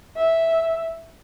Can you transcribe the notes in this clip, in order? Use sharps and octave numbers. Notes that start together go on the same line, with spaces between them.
E5